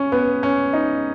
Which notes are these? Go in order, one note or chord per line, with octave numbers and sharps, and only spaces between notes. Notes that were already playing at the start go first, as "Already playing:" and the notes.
Already playing: C#4
B3
C#4
D#4